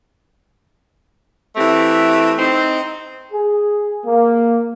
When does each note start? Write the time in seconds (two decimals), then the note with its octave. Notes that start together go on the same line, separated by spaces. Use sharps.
1.56 E3 A3 C4 G4
2.39 C4 D#4
3.32 G#4
4.05 A#3